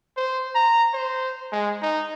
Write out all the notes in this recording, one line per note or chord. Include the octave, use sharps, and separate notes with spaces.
C5
A#5
C5
G#3
D#4